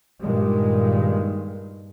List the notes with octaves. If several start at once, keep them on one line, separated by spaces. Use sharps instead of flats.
G2 A#2 D#3 G#3